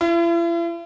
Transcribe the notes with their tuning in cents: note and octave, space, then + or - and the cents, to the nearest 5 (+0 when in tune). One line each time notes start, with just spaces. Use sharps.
E4 +45